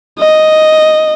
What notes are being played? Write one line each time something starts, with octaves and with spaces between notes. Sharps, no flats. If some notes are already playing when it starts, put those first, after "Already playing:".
D#5